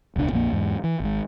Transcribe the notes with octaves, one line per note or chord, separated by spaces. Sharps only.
E1 C#2 C#3 D4
A#1 F2 A#3
E2 G#2
E3
G#1 G#2